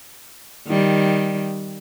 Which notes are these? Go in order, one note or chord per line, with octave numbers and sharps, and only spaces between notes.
D#3 G3